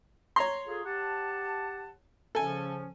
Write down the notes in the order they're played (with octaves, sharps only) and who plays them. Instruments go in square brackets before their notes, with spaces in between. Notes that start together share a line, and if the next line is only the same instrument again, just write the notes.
[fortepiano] C#5 A#5 C6
[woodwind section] F4 G#4 A4
G4 F#5 A5
[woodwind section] C#3 F3 C#4 [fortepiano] A4 G#5